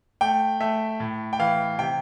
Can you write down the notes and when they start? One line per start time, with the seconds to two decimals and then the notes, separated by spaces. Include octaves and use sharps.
0.21 A3 G5
0.60 A3 E5
1.00 A2
1.33 G5
1.39 E3 F5
1.79 C3 G5